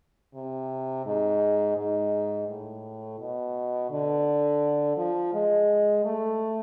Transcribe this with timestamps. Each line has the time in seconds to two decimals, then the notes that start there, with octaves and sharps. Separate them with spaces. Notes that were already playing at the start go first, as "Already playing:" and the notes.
0.35 C3
1.06 G#2
1.77 G#2
2.49 A2
3.19 B2
3.90 D3
4.97 F3
5.34 G#3
6.05 A3